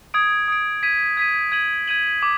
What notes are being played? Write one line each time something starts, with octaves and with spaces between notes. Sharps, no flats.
D#6 G#6 D7
D#6 G#6 D7
G#6 B6 D#7
G#6 B6 D#7
G#6 D#7 F#7
G#6 D#7 F#7
D6